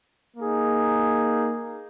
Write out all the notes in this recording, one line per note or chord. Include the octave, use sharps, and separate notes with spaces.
A#3 D#4 G#4